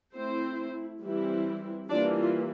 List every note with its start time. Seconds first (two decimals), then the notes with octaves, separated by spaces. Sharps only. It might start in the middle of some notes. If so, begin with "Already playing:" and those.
0.15 A3 C4 E4 C5
1.02 E3 G3 C4 E4
1.89 E3 G3 A#3 D4 F4 D5
2.18 F4